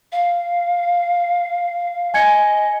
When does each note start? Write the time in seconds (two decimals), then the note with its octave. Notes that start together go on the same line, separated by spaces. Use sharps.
0.12 F5
2.14 D#5 G#5 G#6 C#7